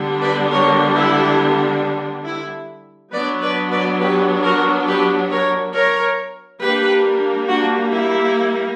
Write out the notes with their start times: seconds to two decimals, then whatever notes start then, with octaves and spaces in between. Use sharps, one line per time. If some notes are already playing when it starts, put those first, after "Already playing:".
Already playing: D3 G3 B3 D4
0.21 B4 D5
0.51 A#4 C#5
0.95 E4
2.25 E4
3.12 F#3 B3 D4 B4 D5
3.41 B4 D5
3.71 B4 D5
3.99 G4 B4
4.42 F#4 A#4
4.86 G4 B4
5.30 A#4 C#5
5.74 A#4 C#5
6.60 G3 A#3 D4 G4 B4
7.47 D4 F#4
7.91 E4